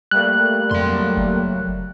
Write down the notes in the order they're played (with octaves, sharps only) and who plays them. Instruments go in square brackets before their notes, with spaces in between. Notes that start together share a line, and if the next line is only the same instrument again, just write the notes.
[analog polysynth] G3 A3 A#3 [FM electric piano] F#6
[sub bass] F2 [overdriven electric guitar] F#3 C6
[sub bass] F#1